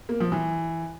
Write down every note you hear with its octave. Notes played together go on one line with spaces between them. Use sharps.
A#3
F3
E3